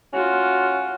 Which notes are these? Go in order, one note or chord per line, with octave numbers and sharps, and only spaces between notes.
C#4 F4 F#4